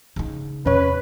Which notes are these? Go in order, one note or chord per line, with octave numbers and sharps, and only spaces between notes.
C#3 D#4
E2 C3 C#4 B4 C#5